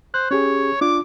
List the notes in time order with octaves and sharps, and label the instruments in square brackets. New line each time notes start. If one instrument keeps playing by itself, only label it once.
[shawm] C5 [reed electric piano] F#6
[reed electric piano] C#4 G4 G#4 [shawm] C#5
[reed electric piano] D4 F4 [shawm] D6